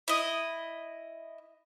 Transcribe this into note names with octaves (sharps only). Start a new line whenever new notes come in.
E4 D#5